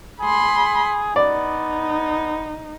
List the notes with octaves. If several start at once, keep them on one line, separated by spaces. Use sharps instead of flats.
G#4 B5 C6
B3 D#4 D5